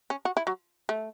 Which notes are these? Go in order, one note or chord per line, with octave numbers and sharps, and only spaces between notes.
C#4
F#4
E4
F#3
A3